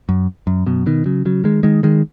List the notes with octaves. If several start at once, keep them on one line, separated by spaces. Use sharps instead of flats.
F#2
F#2
F#2 B2
B2 D#3
C#3 F#3
C#3 F#3
D#3 G#3
D#3 G#3
D#3 G#3